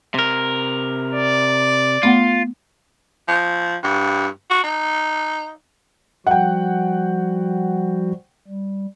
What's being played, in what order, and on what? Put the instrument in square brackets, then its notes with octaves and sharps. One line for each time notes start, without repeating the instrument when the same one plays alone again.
[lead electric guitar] C3 A#4
[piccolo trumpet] D5
[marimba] A3 B3 F#5 [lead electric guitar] F4
[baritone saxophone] F3
G2
F#4
D#4
[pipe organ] F3 G3 F#4 [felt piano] F#5 G5
[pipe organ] G3